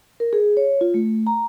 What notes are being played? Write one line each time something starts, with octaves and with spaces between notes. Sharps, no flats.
A#4
G#4
C#5
F4
A3
A#5